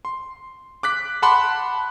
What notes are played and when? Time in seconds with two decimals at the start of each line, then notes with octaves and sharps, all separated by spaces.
0.05 C6
0.83 D6 F#6 B6
1.22 F#5 A5 B5 C6 D6 F#6